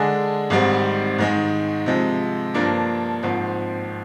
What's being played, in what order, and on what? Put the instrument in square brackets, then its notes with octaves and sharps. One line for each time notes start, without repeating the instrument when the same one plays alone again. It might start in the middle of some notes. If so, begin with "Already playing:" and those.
Already playing: [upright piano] D3 G#3 D4 G#4
G#1 G#2 D#3 G3 C4
G#2 D#3 G#3
C3 F3 G#3
G2 F3 A#3 D4
G#1 G#2 F3 C4